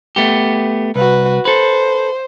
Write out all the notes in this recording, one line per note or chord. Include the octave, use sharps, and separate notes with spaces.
A3 B3 G4
C2 F#4 B4
A4 B4 C5